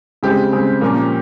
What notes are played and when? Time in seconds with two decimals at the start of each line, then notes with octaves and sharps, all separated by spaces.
0.23 C#3 G#3 C4 G4
0.53 C#3 G#3 C4
0.81 A#2 F3 A#3 C#4